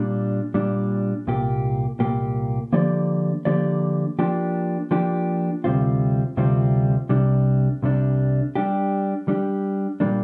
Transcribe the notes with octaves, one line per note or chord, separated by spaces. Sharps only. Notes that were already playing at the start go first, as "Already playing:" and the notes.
Already playing: A#2 G3 D4
A#2 G3 D4
C2 A#2 A#3 G4
C2 A#2 A#3 G4
D3 F3 A#3 G4 D5
D3 F3 A#3 G4 D5
F3 A#3 D4 G4
F3 A#3 D4 G4
D2 C3 G3 C4 F4
D2 C3 G3 C4 F4
C2 C3 G3 D4
C2 C3 G3 D4
G3 D4 G4
G3 D4 G4
A#2 G3 A#3 D4